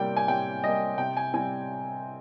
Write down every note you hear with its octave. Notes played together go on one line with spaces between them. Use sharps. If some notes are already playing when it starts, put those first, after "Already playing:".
Already playing: C3 G3 A#3 G5
G#5
C3 G5
G3 A#3 D#5
C3 G5
G#5
G3 C4 G#5